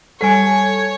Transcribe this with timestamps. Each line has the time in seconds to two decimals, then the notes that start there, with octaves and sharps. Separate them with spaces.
0.21 G3 A4 C#5 F#5 G#5